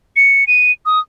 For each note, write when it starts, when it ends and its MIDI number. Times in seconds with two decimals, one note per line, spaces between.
0.16 0.44 97
0.47 0.72 99
0.86 0.99 87